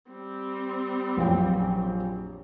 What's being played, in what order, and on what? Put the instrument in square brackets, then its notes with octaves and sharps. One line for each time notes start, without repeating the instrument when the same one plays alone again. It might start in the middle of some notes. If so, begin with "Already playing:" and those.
[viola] G3 C4
[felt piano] A#1 F#2 G5